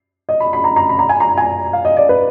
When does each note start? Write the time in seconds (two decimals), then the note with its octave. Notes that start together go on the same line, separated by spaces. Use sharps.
0.29 D#5
0.40 B5
0.53 B5
0.64 A#5
0.76 A#5
0.89 B5
0.99 A#5
1.09 G#5
1.20 A#5
1.38 G#5
1.73 F5
1.85 D#5
1.97 D5
2.09 B4